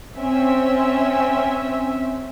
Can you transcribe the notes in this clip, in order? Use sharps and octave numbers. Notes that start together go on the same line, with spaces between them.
C4 C#4 E5